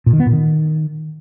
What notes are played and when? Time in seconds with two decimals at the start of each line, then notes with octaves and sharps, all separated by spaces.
0.06 A#2
0.13 D#3
0.20 B3
0.26 A#2
0.33 D#3